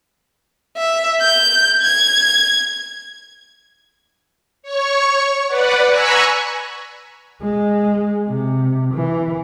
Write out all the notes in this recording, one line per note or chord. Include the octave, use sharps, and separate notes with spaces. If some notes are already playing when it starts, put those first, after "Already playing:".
E5
G6
G#6
C#5 C#6
B4 D5 F#5
G#5 A#5 B5 C#6 E6 F#6
G#3
C3
E3